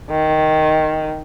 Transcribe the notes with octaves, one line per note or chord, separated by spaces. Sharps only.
D#3